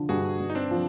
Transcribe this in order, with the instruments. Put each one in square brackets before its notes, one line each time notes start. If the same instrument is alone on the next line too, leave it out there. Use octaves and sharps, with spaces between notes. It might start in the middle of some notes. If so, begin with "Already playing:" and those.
Already playing: [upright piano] D3 F3
[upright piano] G2 [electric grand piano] F#4 G#4
[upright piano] G2
[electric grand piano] D#4
C4 D4
[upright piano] F3